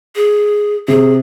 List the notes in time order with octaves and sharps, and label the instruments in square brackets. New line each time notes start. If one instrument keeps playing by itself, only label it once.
[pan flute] G#4
[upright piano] C3 [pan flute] G#4